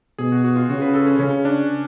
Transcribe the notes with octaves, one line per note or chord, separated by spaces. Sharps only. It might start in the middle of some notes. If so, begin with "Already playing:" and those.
B2 G#4
F#4
F#4
F4
C#3 F#4
B4
A4
C#4
C#3 C#4
D4